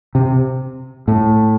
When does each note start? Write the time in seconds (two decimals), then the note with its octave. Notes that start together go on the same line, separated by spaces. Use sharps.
0.15 C3
1.08 A2